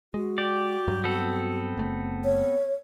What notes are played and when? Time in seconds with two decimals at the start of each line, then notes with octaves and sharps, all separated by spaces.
0.14 G#3 F#4
0.38 G4 D5
0.88 G2 F#3
1.04 B3 C4 A4
1.77 F#1 A3
2.24 C#5